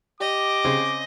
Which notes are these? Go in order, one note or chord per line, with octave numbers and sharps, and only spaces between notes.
G4 D#5 D6
C#3 C4 G#4